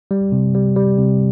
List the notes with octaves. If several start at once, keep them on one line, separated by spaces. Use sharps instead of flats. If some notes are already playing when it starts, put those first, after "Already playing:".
G3
C3
G3
G3
C3